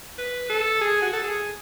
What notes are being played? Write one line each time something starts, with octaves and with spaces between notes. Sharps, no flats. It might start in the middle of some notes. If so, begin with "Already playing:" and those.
B4
A4
G#4
F#4
A4
G#4